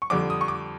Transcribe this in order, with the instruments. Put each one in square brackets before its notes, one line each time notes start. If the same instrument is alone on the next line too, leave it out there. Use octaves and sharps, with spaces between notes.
[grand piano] C#6
F2 D3 G3 D6
D#6
C#6
D6